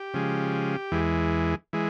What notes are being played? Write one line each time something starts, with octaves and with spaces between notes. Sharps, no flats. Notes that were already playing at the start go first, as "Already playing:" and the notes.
Already playing: G4
C#3 F3 G#3
E2 E3 G#3
E3 G#3